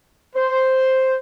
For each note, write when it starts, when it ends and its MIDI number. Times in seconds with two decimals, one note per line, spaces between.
0.35 1.16 72